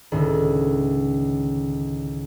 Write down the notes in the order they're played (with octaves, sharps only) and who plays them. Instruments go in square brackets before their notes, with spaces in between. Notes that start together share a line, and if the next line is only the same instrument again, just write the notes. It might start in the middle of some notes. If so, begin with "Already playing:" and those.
[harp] C#2 A2 D3 D#3